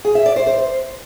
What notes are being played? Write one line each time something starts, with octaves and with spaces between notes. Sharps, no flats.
G#4
E5
D5
C5
C5